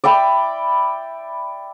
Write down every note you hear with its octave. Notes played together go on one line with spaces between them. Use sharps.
D5 E5 G5 B5